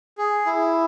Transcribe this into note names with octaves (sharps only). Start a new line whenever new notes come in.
G#4
E4